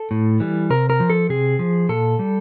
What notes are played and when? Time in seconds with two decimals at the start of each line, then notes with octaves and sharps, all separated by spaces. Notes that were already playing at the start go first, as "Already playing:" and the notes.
Already playing: A4
0.11 A2
0.40 E3 G3
0.70 C3 A#4
0.90 A#4
1.00 F3
1.10 A4
1.29 C3 G#4
1.59 F3
1.89 A#2 A4
2.19 G3